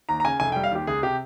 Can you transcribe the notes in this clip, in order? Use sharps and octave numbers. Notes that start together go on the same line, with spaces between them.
D#2 A#5
A#5
C#3 G#5
F1 G#5
G5
G3
F5
D#2 G4
C#2 G#4
C3 G4